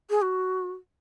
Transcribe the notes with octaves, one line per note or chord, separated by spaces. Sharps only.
G#4
F#4